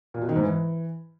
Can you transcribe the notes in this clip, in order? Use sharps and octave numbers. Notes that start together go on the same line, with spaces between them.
A#2
B2
D#3
G#2
E3